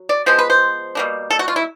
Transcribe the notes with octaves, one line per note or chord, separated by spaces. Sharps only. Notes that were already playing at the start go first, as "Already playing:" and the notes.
Already playing: F#3
D5
F3 G#3 B3 C5
B4
C5
B2 G3 A#3 D4
A4
F#4
F4
E4